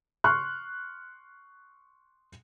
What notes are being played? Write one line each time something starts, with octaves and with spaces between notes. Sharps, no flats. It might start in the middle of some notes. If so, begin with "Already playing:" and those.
C6 C#6 F6 F#6